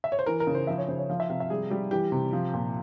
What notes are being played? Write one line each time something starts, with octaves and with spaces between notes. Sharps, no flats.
E5
C#5
C5
E3 A#4
A#4
C#3
C5
F3 E5
C#5
C#3 C5
C#5
F3 F5
E5
C3 F5
E5
G3 G#4
G3 G4
E3 G4
C3
F3
A#2